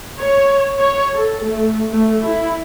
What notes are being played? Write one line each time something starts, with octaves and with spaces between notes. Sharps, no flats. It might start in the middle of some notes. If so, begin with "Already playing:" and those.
C#5
C#5
A4
A3
A3
E4